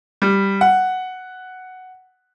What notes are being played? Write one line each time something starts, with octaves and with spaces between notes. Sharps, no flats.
G3
F#5